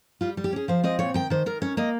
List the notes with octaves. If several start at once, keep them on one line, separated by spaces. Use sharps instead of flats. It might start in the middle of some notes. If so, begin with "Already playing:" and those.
G3 F4
G3
G4
C#4 G#4
F3 C5
C4 D#5
A#2 C#5
D#3 G5
D#3 C5
D#3 A#4
C#4 C#5
A#3 D#5